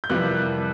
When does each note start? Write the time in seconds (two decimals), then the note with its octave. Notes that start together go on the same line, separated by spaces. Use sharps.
0.04 G6
0.10 F2 C3 E3 G3 A#3 F#6